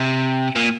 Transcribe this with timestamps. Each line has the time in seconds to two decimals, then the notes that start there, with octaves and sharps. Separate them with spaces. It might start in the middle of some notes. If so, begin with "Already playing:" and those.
Already playing: C3
0.56 A#2